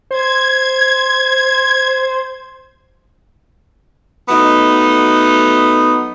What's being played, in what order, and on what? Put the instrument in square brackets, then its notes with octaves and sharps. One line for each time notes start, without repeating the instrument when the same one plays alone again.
[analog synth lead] C5 [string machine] G#6
[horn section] F#3 A3 B3 D#4